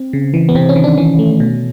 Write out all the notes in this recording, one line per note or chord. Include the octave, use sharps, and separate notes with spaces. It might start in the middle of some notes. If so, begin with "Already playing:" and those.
Already playing: C4
C#3
E3
B3
C3 C4
C#4
D#3
D4
E3 C#4
A3
B2